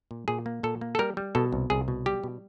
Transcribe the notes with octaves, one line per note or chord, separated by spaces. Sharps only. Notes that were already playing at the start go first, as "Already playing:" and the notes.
A#2
A#2 G#4
A#3
A#2 A4
A#3
A4
G3 A#4
G3
B2 A4
C2
C2 G#4
B2
G3 G4
B2